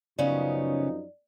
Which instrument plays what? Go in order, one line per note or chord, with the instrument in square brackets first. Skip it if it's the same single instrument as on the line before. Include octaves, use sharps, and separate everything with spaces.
[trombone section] F#2 F3 D#4 [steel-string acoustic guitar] C#3 B3 C#4 [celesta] D5